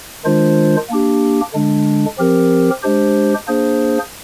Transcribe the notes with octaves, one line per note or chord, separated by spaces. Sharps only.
D#3 G#3 D4 F4 C5
A#3 D4 G4
D3 G#3 D4
F3 C4 G4 A#4
G#3 D4 G4 C5
A#3 D4 G#4 C5